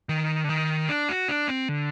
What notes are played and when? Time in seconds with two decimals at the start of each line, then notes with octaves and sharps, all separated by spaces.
0.09 D#3
0.44 D3
0.49 D#3
0.89 D4
1.09 F#4
1.28 D4
1.48 C4
1.69 D3